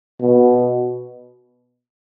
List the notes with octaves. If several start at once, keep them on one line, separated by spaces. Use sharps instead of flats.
B2